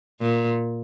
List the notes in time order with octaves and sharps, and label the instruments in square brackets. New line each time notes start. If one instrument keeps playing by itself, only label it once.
[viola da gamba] A#2